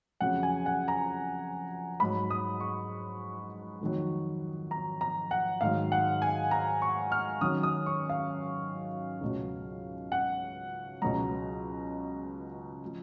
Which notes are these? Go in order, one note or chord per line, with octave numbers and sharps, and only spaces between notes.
F2 C#3 F#3 F#5
G#5
F#5
A#5
G#2 F#3 B5
D#6
C#6
F2 D#3 F#3
A#5
A#5
F#5
G#2 D#3 F#3 F5
F#5
G#5
A#5
C#6
F6
F#2 D#3 F#3 D#6
D#6
C#6
F5
C#2 B2 F#3
F#5
C#2 B2 F#3 A#5
F3